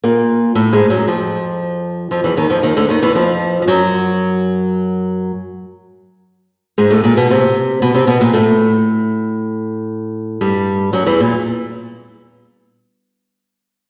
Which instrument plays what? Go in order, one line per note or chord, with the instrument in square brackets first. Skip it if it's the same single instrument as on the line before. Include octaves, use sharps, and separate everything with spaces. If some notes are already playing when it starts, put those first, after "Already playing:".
[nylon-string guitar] A#2 A#3
A2 A3
G#2 G#3
F#2 F#3
F2 F3
F2 F3
E2 E3
D#2 D#3
F2 F3
D#2 D#3
D2 D3
D#2 D#3
E2 E3
F2 F3
F3
F#2 F#3
G#2 G#3
A2 A3
A#2 A#3
B2 B3
C3 C4
B2 B3
C3 C4
B2 B3
A#2 A#3
A2 A3
G2 G3
F#2 F#3
E2 E3
A#2